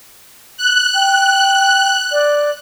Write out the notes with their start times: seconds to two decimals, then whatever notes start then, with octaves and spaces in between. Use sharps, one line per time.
0.57 F#6
0.95 G5
2.12 D5